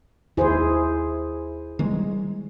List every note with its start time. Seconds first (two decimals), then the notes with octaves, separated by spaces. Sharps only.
0.37 D#2 D#3 E4 G#4 C5
1.79 D#3 G3 G#3